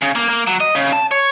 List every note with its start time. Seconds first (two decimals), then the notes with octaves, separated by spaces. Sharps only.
0.02 C#3
0.16 A#3
0.29 A#3
0.47 F#3
0.60 D#5
0.75 C#3
0.93 A5
1.11 C#5